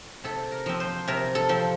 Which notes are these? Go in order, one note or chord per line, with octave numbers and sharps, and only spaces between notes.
C3 A4
A#4
F3 C4
C5
C3 A#4
A4
F3 C4